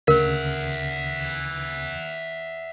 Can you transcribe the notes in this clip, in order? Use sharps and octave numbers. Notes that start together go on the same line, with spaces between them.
D2 C#3 A#4 E5 F#5